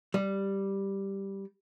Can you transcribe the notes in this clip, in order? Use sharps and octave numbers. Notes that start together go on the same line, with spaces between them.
G3